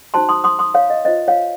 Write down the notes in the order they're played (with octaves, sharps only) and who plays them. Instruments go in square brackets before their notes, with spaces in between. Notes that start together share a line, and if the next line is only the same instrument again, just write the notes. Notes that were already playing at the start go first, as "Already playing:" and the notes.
[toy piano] D#4 F#4 C5 A5 C6
C6 D#6
C6 D#6
C6 D#6
C#5 F5
D#5
F4 C5 D#5
C#5 F5